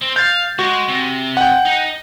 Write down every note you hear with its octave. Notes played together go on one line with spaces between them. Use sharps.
C4
F5 G6 A6
G#3 F#4
C3
F#5 G5
D#4